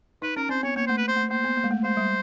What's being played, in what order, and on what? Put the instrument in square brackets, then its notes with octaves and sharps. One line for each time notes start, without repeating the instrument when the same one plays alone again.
[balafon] D#4 [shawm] B4
[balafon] C#4 [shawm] A#4
[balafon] C4 [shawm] C5
[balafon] B3 [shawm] C#5
[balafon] A#3 [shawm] C#5
[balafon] A3 [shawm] C5
[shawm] B4
C5
[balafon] A3
[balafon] A#3 [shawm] C5
[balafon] B3
A#3
G#3
A3
[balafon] G#3 [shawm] C5
[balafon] G3